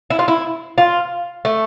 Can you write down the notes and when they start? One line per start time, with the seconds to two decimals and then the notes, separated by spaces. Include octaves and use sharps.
0.10 E4
0.19 F4
0.28 E4
0.78 F4
1.45 A3